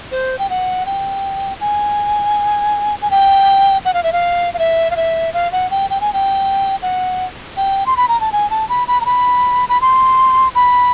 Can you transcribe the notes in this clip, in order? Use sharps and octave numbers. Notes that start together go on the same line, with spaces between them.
C5
G5
F#5
G5
G#5
G#5
G5
F#5
F5
E5
F5
F5
E5
F5
E5
F5
F#5
G5
G5
G#5
G5
F#5
G5
C6
B5
A#5
A5
G#5
A5
B5
B5
A#5
B5
B5
C6
B5